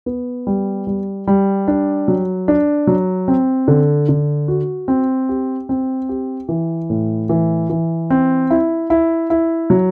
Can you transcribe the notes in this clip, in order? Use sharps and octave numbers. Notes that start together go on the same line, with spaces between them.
B3
G3
G3
G3
D4
F#3
D4
F#3
C4
D3
D3
F#4
C4
G4
C4
G4
E3
A2
E3
E3
C4
E4
E4
E4
F#3